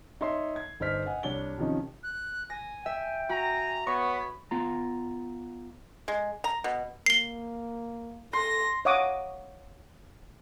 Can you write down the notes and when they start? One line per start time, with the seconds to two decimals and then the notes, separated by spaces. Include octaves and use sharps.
0.21 D#4 C#5 E5 C6 C7
0.56 G#6
0.80 G1 D#4 C5 D5 F6 B6
1.06 D#5 F#5 G#5
1.23 C2 D4 C#5 G7
1.58 C3 D#3 F3 C#4 D#4
2.03 F#6
2.50 G#5 A#6
2.86 E5 G5
3.29 F#4 G#5 A#5
3.87 B3 C#5 B5 C#6
4.51 B3 F4 A#5
6.08 G#3
6.44 A#5
6.64 B2
7.06 A#3 C7 G7
8.33 A4 C6 A#6
8.85 C#5 D#5 F5 F#5 D6 D#6